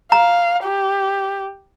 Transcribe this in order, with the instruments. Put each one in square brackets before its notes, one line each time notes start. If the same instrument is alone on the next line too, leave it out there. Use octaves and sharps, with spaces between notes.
[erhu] F5 [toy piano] A#5
[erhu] G4